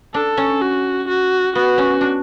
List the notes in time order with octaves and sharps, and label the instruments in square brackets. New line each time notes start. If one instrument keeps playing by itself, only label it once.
[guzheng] D4 [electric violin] A4
[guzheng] C#4
[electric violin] F#4
F#4
[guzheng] B3 [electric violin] F#4
[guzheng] C#4
D4